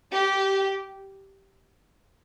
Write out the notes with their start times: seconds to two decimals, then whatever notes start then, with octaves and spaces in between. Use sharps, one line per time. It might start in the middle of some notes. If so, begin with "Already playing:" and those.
0.13 G4